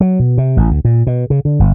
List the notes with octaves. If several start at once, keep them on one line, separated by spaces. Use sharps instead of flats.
F#3
B2
C3
A1
D2
A#2
B2
C#3
D3
G1